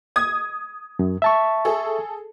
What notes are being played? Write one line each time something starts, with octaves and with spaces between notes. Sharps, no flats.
D#6 G#6
F#2
E5 A5 C#6
G#4 A4